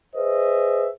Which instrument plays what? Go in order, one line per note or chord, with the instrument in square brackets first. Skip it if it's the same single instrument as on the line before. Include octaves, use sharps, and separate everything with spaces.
[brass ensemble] G#4 B4 C5 D#5 E5